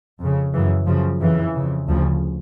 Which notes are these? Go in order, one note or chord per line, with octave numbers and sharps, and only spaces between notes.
F2 C#3
F#2 C#3 E3
F#2 C#3 F3
F2 C#3 E3
F2 C#3
D2 C#3 F3